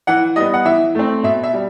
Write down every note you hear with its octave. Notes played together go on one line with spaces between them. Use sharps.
E3 F#5
G3 B3 D#5
F#5
E3 E5
A3 C4
B2 E5
E5
G3